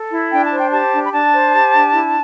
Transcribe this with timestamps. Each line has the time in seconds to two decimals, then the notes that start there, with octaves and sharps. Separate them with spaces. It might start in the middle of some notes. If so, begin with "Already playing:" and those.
Already playing: A4
0.11 E4
0.31 D4 G5
0.44 A5
0.51 C5
0.58 G5
0.71 G4 A5
0.91 D4
1.04 B5
1.12 D4 A5
1.32 C5
1.52 G4
1.72 D4
1.92 E4